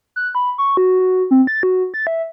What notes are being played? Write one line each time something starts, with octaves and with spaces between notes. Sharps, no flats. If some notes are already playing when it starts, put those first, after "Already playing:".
F#6
B5
C#6
F#4
F#4
C4
A6
F#4
A6
E5